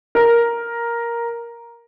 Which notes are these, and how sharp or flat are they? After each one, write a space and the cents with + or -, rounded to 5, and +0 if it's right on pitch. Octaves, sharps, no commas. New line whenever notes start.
A#4 +5